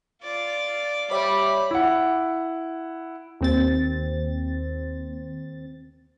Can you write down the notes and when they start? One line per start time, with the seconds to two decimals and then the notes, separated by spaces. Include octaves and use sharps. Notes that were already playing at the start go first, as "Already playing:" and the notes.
0.22 F4 D5
1.11 G3 C#5 E5 B5 D6
1.71 E4 F#5
3.41 D#2 C4 A6